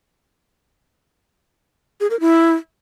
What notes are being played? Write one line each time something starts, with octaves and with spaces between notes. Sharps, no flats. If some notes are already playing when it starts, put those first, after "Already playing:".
G#4
A#4
E4